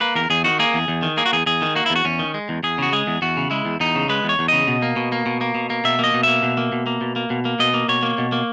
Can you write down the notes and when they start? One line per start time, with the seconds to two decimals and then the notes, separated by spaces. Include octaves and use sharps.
0.01 A#3 B4
0.15 E2 A#4
0.30 E2 G#4
0.44 D#3 F#4
0.59 A#3 G#4
0.74 E2
0.88 E2
1.03 D#3
1.17 A#3 G#4
1.26 F#4
1.33 E2 G#4
1.46 E2 G#4
1.62 D#3
1.75 A#3 F#4
1.86 E4
1.90 E2
1.96 F#4
2.05 E2 C#4
2.19 D#3
2.34 G#3
2.49 E2
2.63 E2 G#4
2.78 C#3 F#4
2.93 G#3 G#4
3.07 E2
3.22 E2 F#4
3.37 C#3
3.51 G#3 E4
3.65 E2
3.80 E2 D#4
3.95 C#3
4.09 G#3 B4
4.24 E2 C#5
4.39 E2
4.48 C#3 D#5
4.68 B2
4.82 A#3
4.96 B2
5.12 A#3
5.26 B2
5.41 A#3
5.55 B2
5.70 A#3
5.84 B2 E5
5.99 A#3 D#5
6.14 B2
6.23 A#3 E5
6.43 B2
6.57 A#3
6.72 B2
6.86 A#3
7.01 B2
7.16 A#3
7.30 B2
7.45 A#3
7.59 B2 D#5
7.74 A#3
7.88 B2 C#5
8.03 A#3
8.18 B2
8.32 A#3